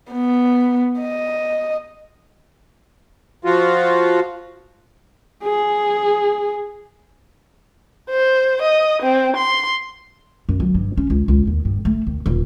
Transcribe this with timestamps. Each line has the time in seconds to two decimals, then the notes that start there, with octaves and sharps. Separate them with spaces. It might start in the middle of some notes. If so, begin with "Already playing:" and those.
0.11 B3
1.00 D#5
3.45 F3 F4 F#4
5.44 G#4
8.10 C5
8.62 D#5
9.03 C4
9.37 C6
10.49 F#2
10.60 F#3
10.74 G2
10.97 C#4
11.10 C#2
11.28 C#2
11.47 D#2
11.65 G2
11.85 A3
12.07 D#2
12.26 D#1